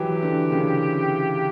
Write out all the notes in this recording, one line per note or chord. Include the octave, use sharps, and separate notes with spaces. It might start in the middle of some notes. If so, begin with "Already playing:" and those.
Already playing: E3 F#3 G4
D3
C#3